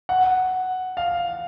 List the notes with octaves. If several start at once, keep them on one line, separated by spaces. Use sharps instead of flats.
F#5
F5